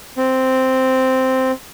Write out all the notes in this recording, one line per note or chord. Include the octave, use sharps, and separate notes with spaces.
C4